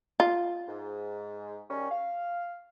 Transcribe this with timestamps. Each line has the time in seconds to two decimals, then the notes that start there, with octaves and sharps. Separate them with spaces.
0.20 F4
0.68 G#2
1.70 D#3 G3 C#4
1.91 F5